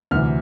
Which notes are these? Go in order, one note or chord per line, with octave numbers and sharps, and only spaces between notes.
D2 C3 E3 F6